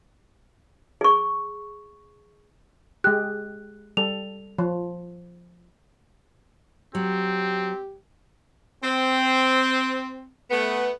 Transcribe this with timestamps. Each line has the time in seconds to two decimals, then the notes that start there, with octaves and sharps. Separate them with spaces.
1.01 G#4 C#6
3.04 G#3 G4 F#6
3.97 G3 A4 F7
4.58 F3
6.95 F#3 C4 G4
8.83 C4
10.51 A3 B3